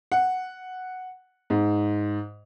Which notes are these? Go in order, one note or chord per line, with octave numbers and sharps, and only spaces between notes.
F#5
G#2